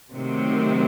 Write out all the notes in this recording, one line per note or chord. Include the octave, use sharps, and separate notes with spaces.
C3 D#3 F#3 A3 C4